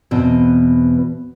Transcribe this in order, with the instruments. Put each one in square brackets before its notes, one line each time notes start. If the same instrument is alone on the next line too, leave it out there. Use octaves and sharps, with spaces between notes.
[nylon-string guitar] E2 B2 C4